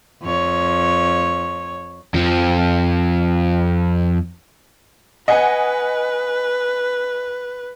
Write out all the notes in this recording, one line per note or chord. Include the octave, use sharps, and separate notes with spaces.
F2 C#5
F2 F3
B4 D#5 F#5 G#5